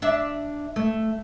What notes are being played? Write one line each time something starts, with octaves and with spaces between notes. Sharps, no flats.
D4 E5
A3